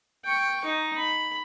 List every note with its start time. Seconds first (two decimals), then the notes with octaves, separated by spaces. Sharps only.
0.24 G5 C#6
0.64 D#4
0.97 B5